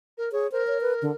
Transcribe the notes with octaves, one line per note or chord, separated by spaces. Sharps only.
A#4
G#4 C#5
A#4 C5
C#5
B4
D3